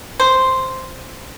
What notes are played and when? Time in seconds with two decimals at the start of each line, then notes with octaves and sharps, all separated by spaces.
0.20 C5